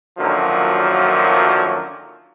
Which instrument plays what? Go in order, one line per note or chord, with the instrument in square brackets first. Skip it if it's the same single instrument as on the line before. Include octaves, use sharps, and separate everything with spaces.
[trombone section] F#2 A#2 D3 D#3 F3 F#3